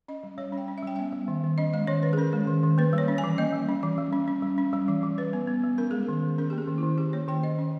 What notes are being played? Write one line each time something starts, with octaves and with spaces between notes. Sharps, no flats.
C#4 D#5
G3
G3 C#5
C#4 G5
C#4
E5
G3 G5
B3 E5
G3
D#3
D#3
C#4 D#5
G#3 D#5
D#3 C#5
D#3 B4
G#4
C#4 A#4
G#3
D#3
D#3
A#3 B4
G3
C#5
C#4
G#5
E3
A#3 D#5
G3
C#4
E3
G3
C#4
C#4
G3
C#4
G3
E3
E3
G3 B4
B3
B3
G3
C#4 A#4
G#3 G#4
A#4
D#3
D#3
C#4 A#4
A#3 G4
G#4
D#3
E4
D#3
C#4 G4
A#3 C#5
D#3 G5
D#3 D#5
C#4